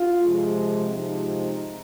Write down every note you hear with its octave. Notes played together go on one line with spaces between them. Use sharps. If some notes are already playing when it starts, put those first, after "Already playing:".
Already playing: F4
C3 F3 G#3
C3 F3 G#3 D#4